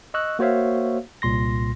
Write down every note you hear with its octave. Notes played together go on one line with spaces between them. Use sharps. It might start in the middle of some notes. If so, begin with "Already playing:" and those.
D#5 C#6 E6 F#6
A#3 F#4 C5 C#5 E5 F5
C2 A#2 C6 A#6